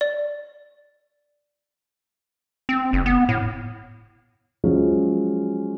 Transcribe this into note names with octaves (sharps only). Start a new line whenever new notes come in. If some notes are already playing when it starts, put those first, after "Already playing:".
D5
C4
F#1
B3
A2
F3 F#3 G#3 C#4